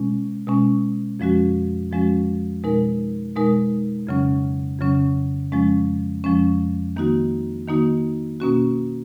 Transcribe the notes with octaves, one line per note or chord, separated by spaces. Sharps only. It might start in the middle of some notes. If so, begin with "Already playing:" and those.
Already playing: B2 G#3 C#4
B2 G#3 C#4
F2 F3 G#3 C#4 F#4
F2 F3 G#3 C#4 F#4
B2 G#3 D#4 A#4
B2 G#3 D#4 A#4
F2 C#3 F#3 C#4
F2 C#3 F#3 C#4
F2 F3 G#3 C#4
F2 F3 G#3 C#4
D#3 A#3 D#4 F#4
D#3 A#3 D#4 F#4
B2 A#3 C#4 F#4